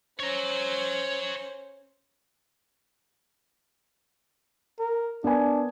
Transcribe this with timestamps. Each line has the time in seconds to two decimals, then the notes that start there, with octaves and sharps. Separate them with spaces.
0.20 C#4 C5 C#5 A#5
4.80 A#4
5.24 B3 D4 A#4 G#5